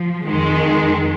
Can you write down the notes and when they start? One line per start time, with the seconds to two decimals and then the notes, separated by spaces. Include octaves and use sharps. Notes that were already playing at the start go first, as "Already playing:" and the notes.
Already playing: F3
0.25 F2 D#3 G#3